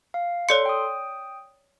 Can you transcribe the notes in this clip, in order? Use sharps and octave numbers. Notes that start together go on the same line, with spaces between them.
F5
A4 C#5 D5 C6 C#7
G5 D#6